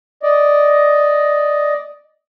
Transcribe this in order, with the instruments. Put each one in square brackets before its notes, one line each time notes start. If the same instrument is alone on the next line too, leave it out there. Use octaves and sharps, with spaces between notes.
[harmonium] D5 D#5